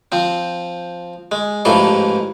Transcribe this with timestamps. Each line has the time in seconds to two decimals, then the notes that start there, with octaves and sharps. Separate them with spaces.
0.12 F3 C4
1.32 G#3
1.65 A1 G#2 E3 F3 A4 C6